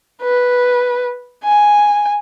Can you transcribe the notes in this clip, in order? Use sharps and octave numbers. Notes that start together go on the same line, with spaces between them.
B4
G#5